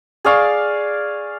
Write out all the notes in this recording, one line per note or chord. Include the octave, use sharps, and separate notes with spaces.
G#4 D5 F5 C#6